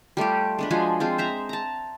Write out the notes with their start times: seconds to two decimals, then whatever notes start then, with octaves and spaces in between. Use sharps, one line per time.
0.17 G3 A3 F4 G4
0.59 G#3 D4 B4
0.71 F3 G#3 F#4 G#4
1.00 G#3 C4 F4
1.18 C5 E5 A#5
1.49 A5 A#5